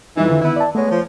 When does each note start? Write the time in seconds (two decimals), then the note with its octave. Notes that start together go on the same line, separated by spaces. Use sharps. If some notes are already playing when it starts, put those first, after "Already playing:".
0.17 F2 E3 G3 D#4
0.30 D3 D#3
0.42 B3 E4
0.56 D5 A5
0.75 G#3 A3 B3 C#5
0.90 F3